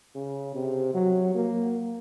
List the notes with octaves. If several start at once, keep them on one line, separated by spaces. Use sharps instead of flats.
C#3
C3
F#3
A#3